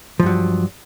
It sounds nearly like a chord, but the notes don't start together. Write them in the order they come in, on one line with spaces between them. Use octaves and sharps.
F3 G2 F#3